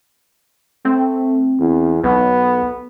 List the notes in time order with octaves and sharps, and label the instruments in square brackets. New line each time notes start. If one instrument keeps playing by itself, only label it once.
[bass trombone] A3 [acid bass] C4
[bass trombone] E2
[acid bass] B1 [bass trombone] B3